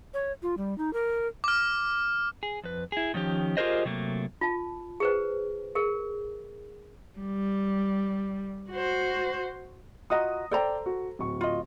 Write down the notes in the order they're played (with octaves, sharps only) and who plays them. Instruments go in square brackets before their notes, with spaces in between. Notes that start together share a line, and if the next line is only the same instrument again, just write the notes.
[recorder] C#5
F4
G3
D#4
A#4
[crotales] D6 F6
[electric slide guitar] G#4
F2 B4
E4 G#4
D#3 F3 C#4 G4
F4 G4 G#4 A#4 C5 D#5
C3 F#3 A3 A#3
[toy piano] F4 A5
G#4 B4 C5
G#4 A#4
[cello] G3
F#4 C5
[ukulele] F4 F#4 D#5 [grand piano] A#5 D#6
[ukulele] A4 C5 A#5 [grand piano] D5 G5
[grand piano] F#4
D1 C#6
[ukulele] F4 D#5